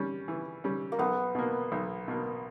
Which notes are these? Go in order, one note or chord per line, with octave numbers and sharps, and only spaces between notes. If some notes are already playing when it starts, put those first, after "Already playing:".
Already playing: G3 C#4
E3
G3 C#4
A#3
B1 B3
B2 A#3
B1
B2 A#3